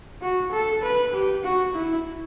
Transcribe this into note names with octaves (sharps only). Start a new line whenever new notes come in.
F#4
A4
B4
G4
F#4
E4